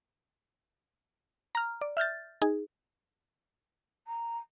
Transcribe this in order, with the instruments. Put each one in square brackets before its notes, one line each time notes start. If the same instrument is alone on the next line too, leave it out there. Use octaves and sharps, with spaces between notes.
[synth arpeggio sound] A#5 F6
D5
E5 F6 G6 A6
D#4 G#4
[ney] A#5